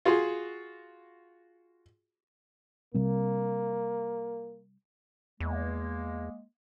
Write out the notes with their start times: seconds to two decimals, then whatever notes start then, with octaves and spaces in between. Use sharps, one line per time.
0.05 F4 F#4 G#4 C6
2.94 C3 G3 A#3 C4
5.40 E2 G#3 A#3